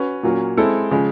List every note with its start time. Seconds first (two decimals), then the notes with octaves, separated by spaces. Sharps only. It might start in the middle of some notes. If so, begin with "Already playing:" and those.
Already playing: C#4 F#4 B4
0.23 A#2 F#3 A#3 C#4
0.57 G#3 C4 E4 A4
0.91 C#3 F3 G#3